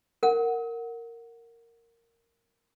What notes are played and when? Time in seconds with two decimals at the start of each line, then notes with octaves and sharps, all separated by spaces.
0.23 A#4 F#5